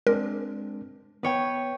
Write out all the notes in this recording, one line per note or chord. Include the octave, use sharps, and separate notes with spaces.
G#3 C4 D4 A#4
B3 B4 C#5 G5